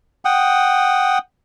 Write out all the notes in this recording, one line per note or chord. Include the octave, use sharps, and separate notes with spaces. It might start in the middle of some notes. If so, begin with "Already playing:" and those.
F#5 G5 D#6